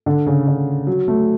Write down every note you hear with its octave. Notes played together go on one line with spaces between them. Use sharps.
D3
C#3
D3
F#3
A3